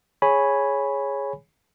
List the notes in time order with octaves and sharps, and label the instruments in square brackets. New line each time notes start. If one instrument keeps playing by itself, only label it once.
[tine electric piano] G#4 C#5 G#5 B5